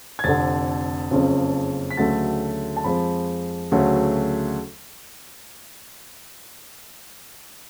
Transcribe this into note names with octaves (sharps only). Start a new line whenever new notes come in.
G#6
F1 F2 D3 A6
F#1 F2 C#3 F3
B6
D2 C#3 F#3 A3 A6
A5
F2 F3 G#3 B5
D2 C#3 F#3 A3